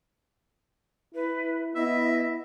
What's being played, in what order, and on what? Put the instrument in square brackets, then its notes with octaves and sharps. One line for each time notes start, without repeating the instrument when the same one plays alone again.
[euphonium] E4 [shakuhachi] B4
[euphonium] B3 [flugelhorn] E4 [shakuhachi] D#5 [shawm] E5